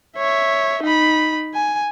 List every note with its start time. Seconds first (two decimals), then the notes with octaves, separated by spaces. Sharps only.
0.18 C#5 E5
0.83 D#4 B5
1.55 G#5